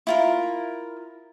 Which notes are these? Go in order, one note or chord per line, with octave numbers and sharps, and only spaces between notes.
E4 F4 A#4